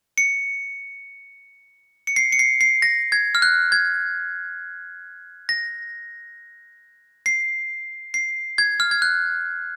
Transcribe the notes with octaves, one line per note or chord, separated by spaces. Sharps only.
C#7
C#7
C7
C#7
C7
C7
A#6
G#6
F6
F#6
G#6
A#6
C7
C7
G#6
F6
G#6
F#6